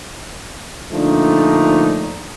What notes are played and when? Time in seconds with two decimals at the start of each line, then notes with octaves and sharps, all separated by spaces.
0.93 A#2 D3 F3 A3 D4 D#4